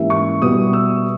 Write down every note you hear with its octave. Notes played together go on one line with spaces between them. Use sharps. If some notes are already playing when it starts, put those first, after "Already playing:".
Already playing: G#2 E3 A#3 C#4 G4 E5
C#6
B2 G3 B3 D#6
E6